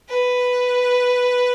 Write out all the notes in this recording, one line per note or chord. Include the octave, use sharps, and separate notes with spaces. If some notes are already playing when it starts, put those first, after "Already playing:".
B4